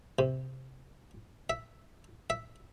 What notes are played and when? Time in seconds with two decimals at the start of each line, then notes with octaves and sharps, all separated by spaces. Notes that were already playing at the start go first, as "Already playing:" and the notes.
0.19 C3
1.50 E5
2.30 E5